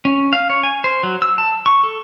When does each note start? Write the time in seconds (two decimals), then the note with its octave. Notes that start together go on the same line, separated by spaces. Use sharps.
0.05 C#4
0.33 F5
0.50 C#5
0.63 G#5
0.84 C5
1.03 F#3
1.22 E6
1.38 A5
1.66 C#6
1.83 A4